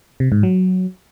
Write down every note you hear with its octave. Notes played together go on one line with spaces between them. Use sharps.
C3
G#2
F#3